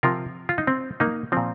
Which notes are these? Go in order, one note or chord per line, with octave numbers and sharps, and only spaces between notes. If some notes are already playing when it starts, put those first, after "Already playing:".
C3 F3 F4 A#4
F4
D#4
C4
A#3 D#4
A#2 F3 C4